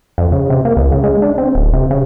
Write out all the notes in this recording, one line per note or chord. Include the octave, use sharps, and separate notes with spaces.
F2
C#3
C3
A#3
C#2
C#3
G#3
D4
C4
D1
C3
C#3